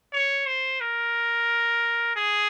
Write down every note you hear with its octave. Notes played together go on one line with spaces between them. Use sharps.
C#5
C5
A#4
G#4